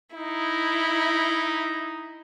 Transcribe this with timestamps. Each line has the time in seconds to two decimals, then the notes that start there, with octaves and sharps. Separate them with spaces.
0.16 D#4 E4